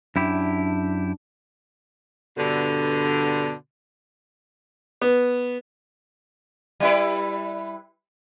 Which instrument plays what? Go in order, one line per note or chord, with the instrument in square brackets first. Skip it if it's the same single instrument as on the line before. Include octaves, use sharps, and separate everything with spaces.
[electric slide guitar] F#2 E4 G4 [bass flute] D4
[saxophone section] G2 B2 D3
[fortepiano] B3
[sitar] G3 E4 B4